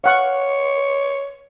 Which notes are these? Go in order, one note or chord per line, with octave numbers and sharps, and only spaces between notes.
C#5 F5 F#5 C#6